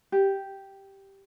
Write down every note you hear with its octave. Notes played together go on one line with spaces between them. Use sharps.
G4